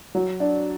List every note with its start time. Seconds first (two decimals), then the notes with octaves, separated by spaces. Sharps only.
0.15 F#3
0.40 D4